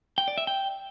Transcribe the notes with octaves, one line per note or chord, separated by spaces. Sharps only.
G5
D5
E5
G5